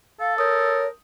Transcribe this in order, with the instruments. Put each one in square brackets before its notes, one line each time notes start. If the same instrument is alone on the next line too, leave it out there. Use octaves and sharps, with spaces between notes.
[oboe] A4 [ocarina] F5
[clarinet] A#4 [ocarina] C#5 [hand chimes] D#6 G6